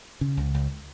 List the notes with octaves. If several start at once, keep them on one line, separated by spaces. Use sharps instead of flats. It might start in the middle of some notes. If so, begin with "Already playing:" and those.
C#3
C#2
C#2